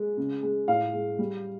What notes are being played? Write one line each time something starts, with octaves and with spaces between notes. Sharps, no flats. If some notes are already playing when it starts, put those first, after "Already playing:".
Already playing: G#3
C#3
G#3
A2 F5
G#3
G3